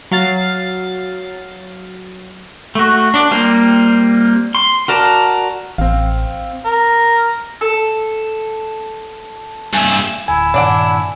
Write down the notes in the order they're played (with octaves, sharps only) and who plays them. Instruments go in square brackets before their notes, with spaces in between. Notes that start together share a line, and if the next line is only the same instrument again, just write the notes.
[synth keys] F#3 F5 A6
[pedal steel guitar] A3 F#4
D4 D5
G3 A#3 C4 F4
C6
F#4 A#4 D5 A5
[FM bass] A1 [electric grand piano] C4 F5
[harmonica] A#4
[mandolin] A4
[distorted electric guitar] G2 E4 [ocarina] G#5
[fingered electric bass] D1 [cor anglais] E4 [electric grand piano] G#5
[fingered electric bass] G2 A#2 D#3 [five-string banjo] D4 D5 F#5